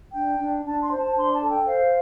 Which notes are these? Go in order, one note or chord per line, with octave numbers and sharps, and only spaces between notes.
D4 G5
D4
D4 A5
C6
C5
A5
D4 C6
A5
A4
G5
C5 F5